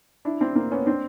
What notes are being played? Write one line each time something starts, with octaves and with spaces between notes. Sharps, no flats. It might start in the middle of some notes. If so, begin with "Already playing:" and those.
D4 E4
C4 D4
A#3 C4
B3 C#4
C4 D4